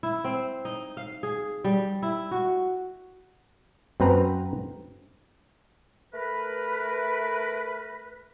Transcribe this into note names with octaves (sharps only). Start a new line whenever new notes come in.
E4
C4
D#4
F5
G#4
G3
E4
F#4
F#2 C4 B4 A#5
A3 A#4 B4